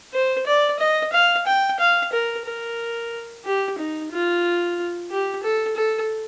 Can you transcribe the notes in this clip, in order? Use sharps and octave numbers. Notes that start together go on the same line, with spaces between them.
C5
D5
D#5
F5
G5
F5
A#4
A#4
G4
D#4
F4
G4
A4
A4